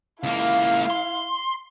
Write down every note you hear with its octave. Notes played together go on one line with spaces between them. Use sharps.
C#2 A#3 E4 F5
C6